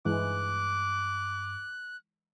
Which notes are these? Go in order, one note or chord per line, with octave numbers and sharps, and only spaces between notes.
G2 E3 G#3 D6 F#6